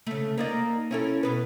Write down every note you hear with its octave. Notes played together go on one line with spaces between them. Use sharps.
C#3 A3
A#3 D#4 D5
C#4 E4 A4
B2 B3 B4